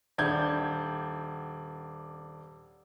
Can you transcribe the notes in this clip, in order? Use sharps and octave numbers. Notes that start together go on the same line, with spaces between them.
D#1 D4 G6 G#6